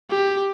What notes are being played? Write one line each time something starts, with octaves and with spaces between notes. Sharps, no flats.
G4